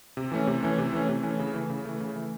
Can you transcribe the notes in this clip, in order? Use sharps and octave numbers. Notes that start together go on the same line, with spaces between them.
C3
E3 A3 C#4
C3
E3 A3 C#4
C3
E3 A3 C#4
C3
E3 A3 C#4
C#3
E3 A3
C#3
E3 A3
C#3
E3 A3